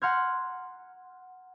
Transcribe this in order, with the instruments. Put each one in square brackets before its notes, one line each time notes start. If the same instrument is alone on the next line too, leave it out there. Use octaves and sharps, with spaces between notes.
[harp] F#5 A#5 C6 F6 G6 G#6